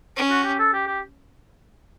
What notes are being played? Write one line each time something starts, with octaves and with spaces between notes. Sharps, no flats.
C#4
F#4
G4
A4
G4
G4